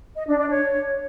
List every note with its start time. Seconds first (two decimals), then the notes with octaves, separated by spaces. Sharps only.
0.16 D#5
0.27 D4
0.38 D4
0.49 C#5